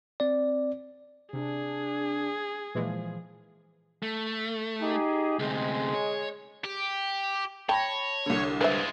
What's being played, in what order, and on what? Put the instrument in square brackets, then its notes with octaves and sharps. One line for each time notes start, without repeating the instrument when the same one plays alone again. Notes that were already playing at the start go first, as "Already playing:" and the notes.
[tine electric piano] C4 D5
[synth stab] C3 [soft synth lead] D4 [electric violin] G#4
[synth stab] A#2 E3 G#3 [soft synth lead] F3
[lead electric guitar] A3
[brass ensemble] D#4 G4 G#4
[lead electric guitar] D2 C3 [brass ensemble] G#3
[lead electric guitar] C#5
[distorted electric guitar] G4
[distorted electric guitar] C#5 [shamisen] G5 [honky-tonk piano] A5 B5 A#6
[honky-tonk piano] C2 D3
[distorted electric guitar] G#3 F4 [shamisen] B4 C5 E5